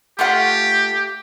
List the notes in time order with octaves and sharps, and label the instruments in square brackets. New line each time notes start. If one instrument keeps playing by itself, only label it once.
[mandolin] A3 F4 F#5 [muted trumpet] G4